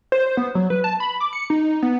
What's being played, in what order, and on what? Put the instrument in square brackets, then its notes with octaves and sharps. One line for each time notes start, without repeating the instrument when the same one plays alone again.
[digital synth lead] C5
B3
F#3
B4
A5
B5
D6
C#7
D#4
B3